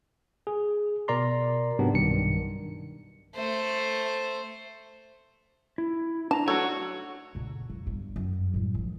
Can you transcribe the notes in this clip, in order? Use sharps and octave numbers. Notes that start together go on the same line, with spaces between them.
G#4
B2 A#4 D5 A#5 C6
G#2 C3 F#3 B3 D4 G4
B1 G2 D#3 C#7
A3 C5
E4
D4 A5 A#5
A3 D#4 F#4 C#5
C#2 A#2
F2
G1 G2
F#2
A2 G3
D#3 F3